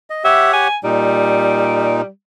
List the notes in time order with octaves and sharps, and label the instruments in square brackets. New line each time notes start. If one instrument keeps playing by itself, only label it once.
[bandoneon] D#5
[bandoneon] G4 C#5 F#5 [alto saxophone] E5
[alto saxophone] G#5
[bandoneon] A#2 D#4 [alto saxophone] G3